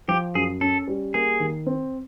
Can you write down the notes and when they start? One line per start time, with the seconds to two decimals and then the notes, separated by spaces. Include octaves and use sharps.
0.08 F3 G4
0.35 F#2 G#4
0.61 C#4 A4
0.88 G3
1.14 A#3 G#4
1.40 D#3
1.67 C4